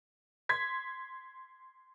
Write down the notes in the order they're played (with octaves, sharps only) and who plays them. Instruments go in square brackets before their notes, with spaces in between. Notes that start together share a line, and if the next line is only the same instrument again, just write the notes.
[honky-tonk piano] C6 G#6 B6